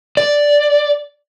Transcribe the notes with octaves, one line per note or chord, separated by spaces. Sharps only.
D5